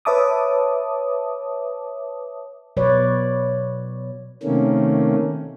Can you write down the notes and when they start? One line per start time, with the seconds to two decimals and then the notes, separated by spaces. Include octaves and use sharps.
0.05 B4 C#5 E5 A5 D6 D#6
2.77 B2 F#3 B4 C#5 D5
4.43 C3 D#3 A3 A#3 C#4